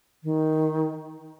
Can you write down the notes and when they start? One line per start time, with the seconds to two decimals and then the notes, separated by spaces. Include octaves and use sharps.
0.24 D#3